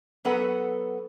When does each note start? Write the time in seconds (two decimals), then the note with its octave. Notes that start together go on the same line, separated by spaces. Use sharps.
0.25 F#3 B3 A4 B4 F#5